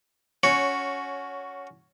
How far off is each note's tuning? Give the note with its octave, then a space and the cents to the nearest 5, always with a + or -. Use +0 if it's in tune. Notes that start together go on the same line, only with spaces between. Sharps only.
C#4 +15 F#4 +0 C#5 +0